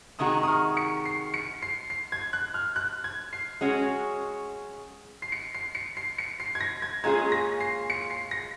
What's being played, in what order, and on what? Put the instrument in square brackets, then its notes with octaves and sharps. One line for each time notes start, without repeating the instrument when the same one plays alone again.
[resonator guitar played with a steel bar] C3 D#3 G#3 D#4 F#4 [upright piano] D#6
[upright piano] D#6
F6
C#7
C7
C#7
C7
C7
G#6
F#6
F6
F#6
G#6
C7
[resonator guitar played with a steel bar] G#3 C#4 F#4
[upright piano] C7
C#7
C7
C#7
C7
C#7
C7
G#6
A#6
G#6
[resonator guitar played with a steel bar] A#2 G#3 C#4 F4 G#4 [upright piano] G#6
[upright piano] A#6
C7
C#7
C7
A#6